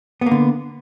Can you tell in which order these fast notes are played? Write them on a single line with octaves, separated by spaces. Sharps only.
B3 A#3 D3